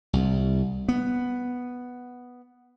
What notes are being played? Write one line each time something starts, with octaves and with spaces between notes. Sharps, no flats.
C2
B3